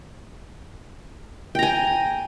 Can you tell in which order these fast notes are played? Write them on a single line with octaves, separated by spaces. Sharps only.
G5 A#5 G#5